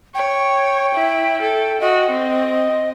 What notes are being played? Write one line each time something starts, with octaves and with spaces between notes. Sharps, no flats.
C#5 G5
E4
A4
F#4 D#5
C4